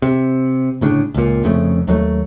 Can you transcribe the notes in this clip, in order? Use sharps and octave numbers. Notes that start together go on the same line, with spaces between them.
C3
G1 A2 C#3 D4
C#2 A#2
F1 F2 C#3 A3
D#2 F#3 G#3 A3